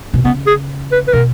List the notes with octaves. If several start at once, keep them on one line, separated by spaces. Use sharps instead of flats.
B2
C#3 B3
G#4
B4
B4
B2 A#4